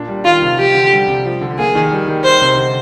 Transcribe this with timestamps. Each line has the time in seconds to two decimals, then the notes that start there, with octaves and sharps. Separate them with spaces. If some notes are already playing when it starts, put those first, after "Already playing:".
Already playing: A#2 D4
0.08 G3
0.25 D#3 F4
0.42 C3
0.59 F3 G4
0.75 D3
0.92 G3
1.08 C3
1.25 F3
1.41 D3
1.58 A#3 G#4
1.75 D#3
1.92 G3
2.08 D#3
2.24 D#3 C5
2.42 C3
2.57 D3